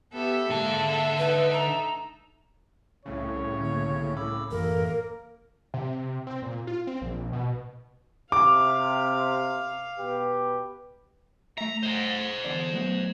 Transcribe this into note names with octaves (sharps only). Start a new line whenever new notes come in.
B3 G4 A4 E5
G#2 D3 A#3 A5
D#4 B4
A#5
C2 A2 C#3 C#5
D3 A#3
B5 D6 E6
A1 F#2 E3 A#3 A4 A#4
C3
C4
A#2
F4
C4
A#1
B2
C3 F5 D6
B2 G4 B4
A3 E5 A#5
C5 D#5
E2 D3 D5
F#3 A3 B3